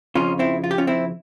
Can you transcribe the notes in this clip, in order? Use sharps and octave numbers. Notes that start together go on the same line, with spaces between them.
F2 C#3 F3 C#4 F4
C4 E4
F4
G4
C#4 F4
C4 E4